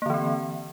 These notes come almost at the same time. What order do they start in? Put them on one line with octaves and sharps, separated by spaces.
A#3 D3 E3 C4